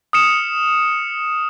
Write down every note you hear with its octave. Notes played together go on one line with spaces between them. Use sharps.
D#6 F6 C#7 E7